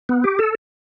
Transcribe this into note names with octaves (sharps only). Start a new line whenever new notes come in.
B3
G4
A4